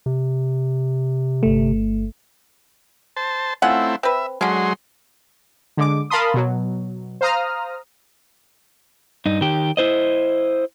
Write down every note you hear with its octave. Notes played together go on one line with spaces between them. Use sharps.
C3
G1 A3
C5 A5
A3 C4 C#4 E4 F4 F#5
C4 B4 E5
D3 F#3 G#3 C#4 C6
D3 G#3 D6
A#4 F5 A5 B5 C6 D#6
B2 F#3
C5 F5 A#5 D#6 F6
G2 D#4
D#3 G4
E4 C5 D#5